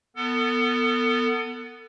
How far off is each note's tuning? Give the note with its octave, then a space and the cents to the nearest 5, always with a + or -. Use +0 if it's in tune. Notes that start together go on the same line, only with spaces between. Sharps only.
B3 +0 A4 +35